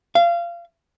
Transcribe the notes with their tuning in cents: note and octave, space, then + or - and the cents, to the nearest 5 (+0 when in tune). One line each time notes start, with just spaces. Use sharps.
F5 -25